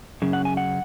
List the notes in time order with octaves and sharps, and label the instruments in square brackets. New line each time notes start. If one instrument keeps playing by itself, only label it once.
[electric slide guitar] F#2 C#3
F#5
G#5
F#5